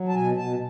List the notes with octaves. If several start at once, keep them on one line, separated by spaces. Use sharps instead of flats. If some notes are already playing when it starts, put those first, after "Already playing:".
Already playing: F#3
A5
B2 G#5
B2 A5